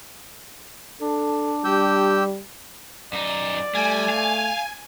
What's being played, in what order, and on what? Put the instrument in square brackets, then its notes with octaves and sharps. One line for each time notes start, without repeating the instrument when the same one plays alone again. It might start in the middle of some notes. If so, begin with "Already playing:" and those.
[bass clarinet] D4 [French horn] A4
[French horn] G3 [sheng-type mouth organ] G4 E6 G6
[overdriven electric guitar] F#2 D#4 [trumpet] D5
[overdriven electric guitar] G3 [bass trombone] A3 [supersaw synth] G#5
[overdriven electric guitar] F5